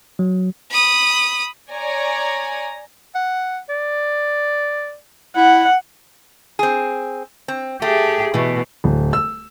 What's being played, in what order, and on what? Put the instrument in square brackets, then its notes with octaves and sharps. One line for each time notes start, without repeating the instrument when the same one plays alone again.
[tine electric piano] F#3
[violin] B5 D#6
[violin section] C#5 D5 G#5 A#5
[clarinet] F#5
D5
[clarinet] E4 [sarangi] F#5
[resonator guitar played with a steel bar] C4 G#4
C4
[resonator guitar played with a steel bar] A3 [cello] G4 G#4
[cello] B2 [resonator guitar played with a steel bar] E3 A3
[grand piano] D1
E6